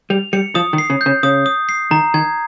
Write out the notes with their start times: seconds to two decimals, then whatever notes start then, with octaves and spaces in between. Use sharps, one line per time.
0.10 G3 F7
0.33 G3 C#7
0.55 F3 D#6
0.73 D#3
0.78 C7
0.90 C#3
1.01 G6
1.06 C#3
1.23 C#3 D#6
1.46 D#6
1.69 C7
1.91 D#3 A#5
2.14 D#3 G#6